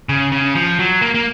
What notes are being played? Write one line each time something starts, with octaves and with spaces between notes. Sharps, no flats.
C#3
C#3
F3
F#3
A#3
A#3